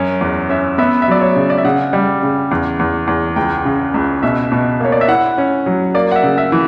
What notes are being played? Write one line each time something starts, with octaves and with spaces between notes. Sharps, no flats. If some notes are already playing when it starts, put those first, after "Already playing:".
Already playing: F#2 C#4
E2
C#4 E5
B3 E5
E5
F#3 D5
C#5
C#3
D5
E5
C#3 F#5
G3
C#3
E2
E2
E2
C#2 G5
C#3
C#2
B2 E5
B2
A#3 C#5
D5
E5
E4 F#5
C#4
F#3
A#3 D5
F#5
E5
C#3
E5
E3